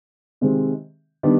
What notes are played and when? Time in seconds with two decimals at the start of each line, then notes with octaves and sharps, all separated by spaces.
0.41 C3 D#3 G#3 C4
1.23 D#3 G3 B3 D4